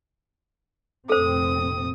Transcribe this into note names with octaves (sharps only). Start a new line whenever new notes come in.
F1 A#2 C4 A4 C5 D#6